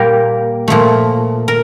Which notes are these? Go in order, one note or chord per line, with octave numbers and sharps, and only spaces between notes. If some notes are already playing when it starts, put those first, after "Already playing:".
Already playing: A#2 G3 A#3 G4 A#4
A#2 F3 A3
A#4